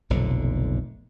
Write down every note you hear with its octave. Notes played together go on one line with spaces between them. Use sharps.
F1 B1 A#2 D3